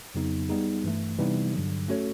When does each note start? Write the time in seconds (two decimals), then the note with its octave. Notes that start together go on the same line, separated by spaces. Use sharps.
0.15 F2 C#3 F#3 B3 D#4
0.49 G3 B3 D#4 G#4
0.84 G2 E3 A3
1.18 C3 E3 G3 B3 D#4
1.53 G2 D3 F#3
1.88 A3 C#4 F#4 A4 C#5